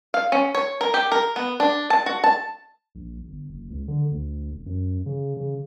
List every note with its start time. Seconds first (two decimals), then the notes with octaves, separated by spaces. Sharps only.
0.14 F5
0.32 C#4
0.55 C#5
0.81 A#4
0.94 G4
1.12 A#4
1.36 B3
1.60 D4
1.90 A5
2.06 F#4
2.24 A5
2.95 A#1
3.28 G1
3.49 F#1
3.70 C#2
3.88 D3
4.11 D2
4.52 E1
4.66 F#2
5.06 C#3
5.37 C#3